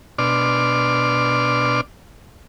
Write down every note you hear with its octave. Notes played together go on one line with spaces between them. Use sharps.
B2 D4 D5 C6 D6 F6